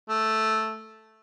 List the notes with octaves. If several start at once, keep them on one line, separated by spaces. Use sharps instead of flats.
A3